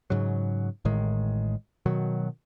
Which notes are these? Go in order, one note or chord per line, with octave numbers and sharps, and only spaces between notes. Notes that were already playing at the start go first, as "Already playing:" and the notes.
G#2 C#3 F#3
A1 A2 D#3 G#3
B2 D#3 F#3